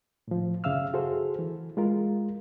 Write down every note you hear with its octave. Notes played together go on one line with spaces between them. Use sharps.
A2 F3
F#2 C#3 E5 F5 E6 F6
F#4 G#4 A4 C5
E3
G#3 F4 A#4